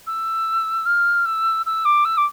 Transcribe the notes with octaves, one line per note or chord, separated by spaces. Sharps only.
E6
F6
E6
E6
D6
E6
D6